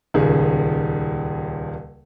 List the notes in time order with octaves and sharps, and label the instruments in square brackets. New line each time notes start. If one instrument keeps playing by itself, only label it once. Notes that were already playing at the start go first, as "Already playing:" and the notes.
[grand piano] D#1 C#2 D#3 G#4